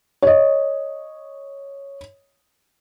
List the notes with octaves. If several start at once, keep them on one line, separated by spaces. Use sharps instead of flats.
C#5 D#5